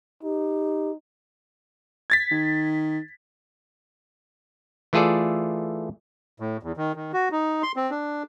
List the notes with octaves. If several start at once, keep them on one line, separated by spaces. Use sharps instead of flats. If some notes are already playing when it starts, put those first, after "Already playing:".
D#4 G4
G#6 A6 B6
D#3
E3 A3 F4 G#4 A4 D5
A2
E2
D#3
D#3
F#4
D#4
C6
C4
D4